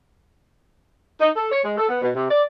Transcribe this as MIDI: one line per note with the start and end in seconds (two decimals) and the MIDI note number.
1.20 1.29 63
1.35 1.48 69
1.51 1.59 73
1.64 1.76 56
1.77 1.88 69
1.88 1.98 59
2.01 2.09 47
2.14 2.28 48
2.30 2.42 74